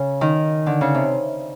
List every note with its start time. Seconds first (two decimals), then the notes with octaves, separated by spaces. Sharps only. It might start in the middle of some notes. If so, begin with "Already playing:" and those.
Already playing: C#3
0.21 D#3
0.66 D3
0.81 C#3
0.94 C3